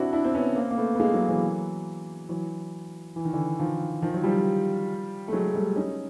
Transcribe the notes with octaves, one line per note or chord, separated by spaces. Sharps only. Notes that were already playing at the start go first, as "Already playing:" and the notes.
Already playing: C4 D4 E4 F#4
D4 E4
C4
B3 C#4
A#3 C4
A#3
A3 B3
B3
G#3 A#3
F#3 G#3
E3 F#3
E3 F#3
E3
D#3
D3 E3
D#3 F3
D#3 F3
F#3
F3 G3
A3
F#3 G#3
G3 A3
C#4 D#4